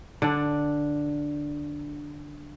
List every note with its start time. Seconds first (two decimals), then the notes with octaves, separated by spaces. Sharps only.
0.22 D3 D4